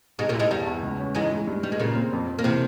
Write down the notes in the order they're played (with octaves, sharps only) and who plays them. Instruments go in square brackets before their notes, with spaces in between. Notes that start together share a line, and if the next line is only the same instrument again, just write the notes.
[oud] G#2 G#3 [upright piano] C3
[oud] A#2 A#3
[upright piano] E4
[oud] G#2 G#3
[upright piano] E2 [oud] G2 G3
[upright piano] E2
C#2
C#4
[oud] G#2 G#3 [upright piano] E3
[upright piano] E3
G2
[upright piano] G2 [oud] G3
[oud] G#3
[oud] A#2 A#3 [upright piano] C#3
[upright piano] C4
F2
F2
[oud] A#3
[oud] C3 C4 [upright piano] E3